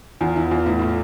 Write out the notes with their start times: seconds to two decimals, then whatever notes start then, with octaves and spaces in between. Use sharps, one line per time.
0.21 E2 F4
0.36 E3 E4
0.51 E2 F4
0.66 A2 E4
0.79 A2 F4